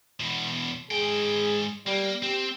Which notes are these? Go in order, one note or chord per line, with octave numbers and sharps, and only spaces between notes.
E2 B2
G#2 G#4 G5
G3 A#3
C4 G4